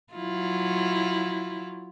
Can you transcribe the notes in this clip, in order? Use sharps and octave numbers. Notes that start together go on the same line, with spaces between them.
F#3 E4 F4